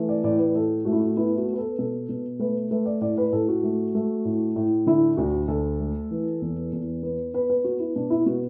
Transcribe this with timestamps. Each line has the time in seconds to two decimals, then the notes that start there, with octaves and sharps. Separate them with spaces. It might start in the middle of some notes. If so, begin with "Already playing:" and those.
Already playing: E3 A3
0.09 D5
0.24 A2 D5
0.39 B4
0.55 A2 A4
0.85 A3 F#4
0.92 E4
1.00 F#4
1.17 B3 E4
1.38 F#4
1.47 B3
1.53 B4
1.58 A4
1.78 B2 A4
2.09 B2
2.39 A3 B4
2.71 A3 B4
2.86 D5
3.01 A2 D5
3.18 B4
3.33 A2 A4
3.49 F#4
3.63 A3
3.95 A3
4.25 A2
4.56 A2
4.87 D3 E4
5.17 D2 F#4
5.48 D2 A4
5.80 A3
6.11 E3
6.42 E2
6.73 E2
7.03 B3
7.34 B3 B4
7.50 B4
7.64 B3 F#4
7.79 E4
7.96 B2 D4
8.10 E4
8.26 B2 F#4